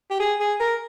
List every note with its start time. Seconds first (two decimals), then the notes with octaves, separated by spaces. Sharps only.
0.10 G4
0.20 G#4
0.40 G#4
0.60 A#4